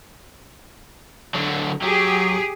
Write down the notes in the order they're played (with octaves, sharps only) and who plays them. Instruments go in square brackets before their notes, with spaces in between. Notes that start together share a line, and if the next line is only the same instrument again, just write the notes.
[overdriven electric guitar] D3 F#3
[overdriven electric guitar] F#3 [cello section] G4 G#4